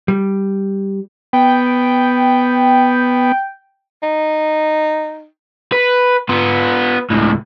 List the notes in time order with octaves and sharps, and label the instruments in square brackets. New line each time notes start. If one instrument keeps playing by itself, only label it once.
[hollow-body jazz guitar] G3
[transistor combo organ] B3 [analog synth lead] G5
[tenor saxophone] D#4
[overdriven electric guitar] B4
B3 F4
C#2 A2